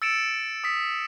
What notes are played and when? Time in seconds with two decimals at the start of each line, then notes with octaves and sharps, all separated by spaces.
0.02 E6 A6 C#7 D7 E7
0.64 D#6 B6